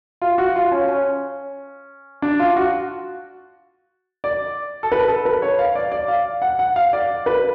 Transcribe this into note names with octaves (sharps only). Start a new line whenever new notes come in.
F4
F#4
F4
C#4
C#4
D4
F4
F#4
D5
A4
B4
A4
B4
C#5
F5
D5
D5
F5
F#5
F#5
F5
D5
B4